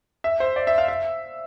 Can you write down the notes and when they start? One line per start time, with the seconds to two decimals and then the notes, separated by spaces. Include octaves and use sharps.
0.24 E5
0.40 C5
0.56 D5
0.67 E5
0.78 F5
0.88 E5